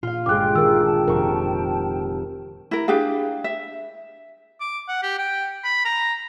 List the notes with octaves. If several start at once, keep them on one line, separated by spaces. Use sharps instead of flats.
A#2 F4 F5
G1 G#3 F4 G5 D6 F#6
D#3 A#4 E6
G5 A5
F1 A#4 C#6
E4 A#4
D4 G4 G#4 F5
E5
D6
F#5
G4
G5
B5
A#5